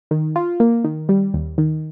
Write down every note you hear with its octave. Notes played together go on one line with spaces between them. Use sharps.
D#3
F4
A#3
D#3
G3
D#2
D#3